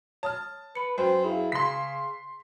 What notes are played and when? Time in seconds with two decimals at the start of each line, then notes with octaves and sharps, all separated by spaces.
0.23 C#5 A5 D#6 F6
0.75 B4 B5 C#7
0.98 F#2 B4 C5 G5
1.25 E4 G#4 F5
1.52 C#3 C6 B6